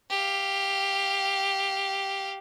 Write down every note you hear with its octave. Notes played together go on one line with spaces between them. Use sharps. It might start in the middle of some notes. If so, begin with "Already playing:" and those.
G4 F5